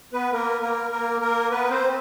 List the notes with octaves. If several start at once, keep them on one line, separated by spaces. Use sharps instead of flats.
B3 B4
A#3 A#4
A#3 A#4
A#3 A#4
A#3 A#4
B3 B4
C4 C5